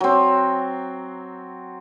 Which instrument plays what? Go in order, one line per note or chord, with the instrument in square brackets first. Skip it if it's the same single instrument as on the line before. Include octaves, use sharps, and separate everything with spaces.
[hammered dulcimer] F#3 C4